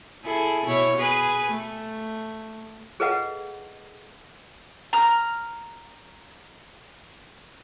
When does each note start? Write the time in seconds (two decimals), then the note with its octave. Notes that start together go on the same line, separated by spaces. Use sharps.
0.25 E4 G#4 A4
0.66 B2 E4 C#5
0.98 G#4 B4
1.51 A3
3.00 G#4 A4 B4 D#5 F5 F#5
4.93 A#5 F6